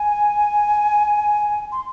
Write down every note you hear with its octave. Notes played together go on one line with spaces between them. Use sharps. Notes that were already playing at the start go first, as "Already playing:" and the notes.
Already playing: G#5
C6